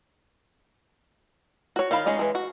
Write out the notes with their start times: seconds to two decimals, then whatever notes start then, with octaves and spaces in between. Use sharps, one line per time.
1.76 F#4 C#5
1.91 D#3 F4 F5 B5
2.06 G#3 C#4 D#4 F4
2.19 E3 G#3
2.35 F#4